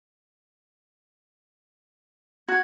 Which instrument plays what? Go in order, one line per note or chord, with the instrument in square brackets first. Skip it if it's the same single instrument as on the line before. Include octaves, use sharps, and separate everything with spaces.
[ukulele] F#4 [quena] G#6